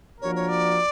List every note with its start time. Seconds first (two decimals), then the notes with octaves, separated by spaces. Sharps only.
0.21 F3 A#3 D4 F#4 A#4 C#5
0.35 C#5
0.48 D5